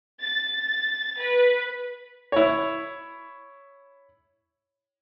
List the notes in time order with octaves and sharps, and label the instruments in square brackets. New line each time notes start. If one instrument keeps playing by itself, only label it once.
[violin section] A6
B4
[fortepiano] E4 C#5